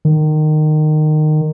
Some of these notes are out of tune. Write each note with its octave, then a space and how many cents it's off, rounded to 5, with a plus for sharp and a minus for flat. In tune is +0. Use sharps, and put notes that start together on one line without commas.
D#3 -20